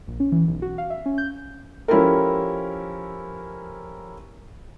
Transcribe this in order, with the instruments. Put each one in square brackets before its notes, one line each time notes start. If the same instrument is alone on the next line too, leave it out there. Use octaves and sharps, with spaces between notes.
[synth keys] A#1
C#4
E3
B1
F#4
F5
E5
C#4
G6
[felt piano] F3 C#4 E4 G4 A4 A#4